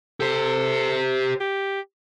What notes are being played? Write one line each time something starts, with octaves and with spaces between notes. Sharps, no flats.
G4 A4 C5
G4